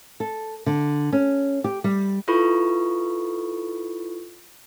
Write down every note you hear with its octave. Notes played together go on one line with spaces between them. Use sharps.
A4
D3
C#4
G4
G3
E4 F4 A4 B4 B5 C#6